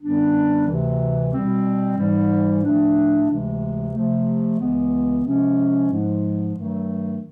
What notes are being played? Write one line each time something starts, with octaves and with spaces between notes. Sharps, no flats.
F#2 D3 G3 B3 D4
D2 C3 E3
B2 G3 C4
G#2 E3 G3
A2 F3 A3 D4
D2 C3 E3 G#3
C3 F3 A3
C#2 C#3 E3 G#3 B3
C3 F3 G#3 C#4
G#2 F3 G#3
G2 D#3 F#3 A3